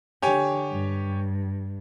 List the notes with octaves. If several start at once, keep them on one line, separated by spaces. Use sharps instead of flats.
D3 G4 C#5 G#5
G2